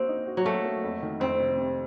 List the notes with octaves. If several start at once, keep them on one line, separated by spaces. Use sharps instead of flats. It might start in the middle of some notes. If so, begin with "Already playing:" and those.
Already playing: A#3 C4 F#4
D#4
F#4
F#3
A3 A#3
A#3
F2
D#3
F2 C4
C3
C3